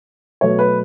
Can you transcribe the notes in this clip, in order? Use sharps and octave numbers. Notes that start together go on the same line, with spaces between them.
B2 F#3 A3 C#5
B4